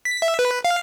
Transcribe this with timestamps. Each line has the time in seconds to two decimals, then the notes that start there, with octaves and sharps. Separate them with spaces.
0.05 B6
0.22 E5
0.39 B4
0.65 F5